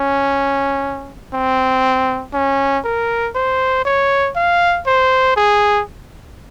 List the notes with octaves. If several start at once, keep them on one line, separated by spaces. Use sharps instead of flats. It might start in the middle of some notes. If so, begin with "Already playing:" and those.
Already playing: C#4
C4
C#4
A#4
C5
C#5
F5
C5
G#4